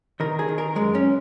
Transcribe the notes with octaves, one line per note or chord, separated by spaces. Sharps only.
D#3 A#4
G#4
D#3
A#4
F#2 G#3
C#4